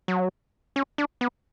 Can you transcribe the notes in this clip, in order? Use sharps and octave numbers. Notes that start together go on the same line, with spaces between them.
F#3
C#4
D4
B3